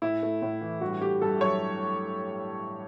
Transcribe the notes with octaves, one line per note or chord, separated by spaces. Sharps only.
A2 E4
A3
A2
E3
G2 F#4
A3 G4
G2 A4
F#3 C#5